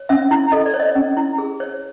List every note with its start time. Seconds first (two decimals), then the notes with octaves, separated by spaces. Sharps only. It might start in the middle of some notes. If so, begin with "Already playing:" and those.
Already playing: C#5
0.09 C#4 E5
0.31 E4
0.52 A4 D#5
0.66 D5
0.74 C#5
0.80 D#5
0.95 C#4
1.17 E4
1.38 G#4
1.60 C#5